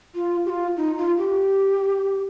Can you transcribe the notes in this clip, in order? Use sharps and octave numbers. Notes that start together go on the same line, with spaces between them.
F4
G4
F4
D#4
F4
G4